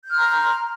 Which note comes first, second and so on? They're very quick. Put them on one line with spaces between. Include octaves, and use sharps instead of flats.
G6 F6 C6 A#5